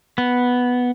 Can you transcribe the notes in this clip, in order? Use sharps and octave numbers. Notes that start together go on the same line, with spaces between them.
B3